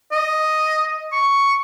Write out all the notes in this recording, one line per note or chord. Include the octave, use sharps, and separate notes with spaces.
D#5
C#6